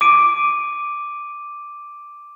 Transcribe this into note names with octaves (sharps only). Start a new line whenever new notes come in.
D6 D7 D#7